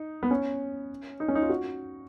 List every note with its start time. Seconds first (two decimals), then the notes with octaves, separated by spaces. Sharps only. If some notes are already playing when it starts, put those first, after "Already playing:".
Already playing: D#4
0.23 B3
0.31 C#4
1.20 D#4
1.28 C#4
1.35 D#4
1.42 F4
1.49 F#4